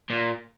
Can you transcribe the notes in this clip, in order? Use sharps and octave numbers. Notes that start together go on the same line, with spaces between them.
A#2